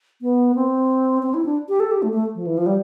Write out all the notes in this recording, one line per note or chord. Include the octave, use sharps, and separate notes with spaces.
B3
C4
C4
E4
D4
G4
A4
G4
A3
A3
F3
E3
F3
G3